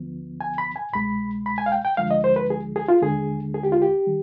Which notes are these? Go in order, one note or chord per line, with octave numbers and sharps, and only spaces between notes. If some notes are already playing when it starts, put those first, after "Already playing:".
Already playing: D2 D3 F3 B3
G#5
B5
G#5
C2 B2 G#3 B5
B5
G#5
F5
G5
G5
D2 D3 F3 G#3 F5
D#5
C5
B4
G#4
G#4
F4
D#2 D3 G#3 G#4
G#4
G4
F4
G4
D#3 G3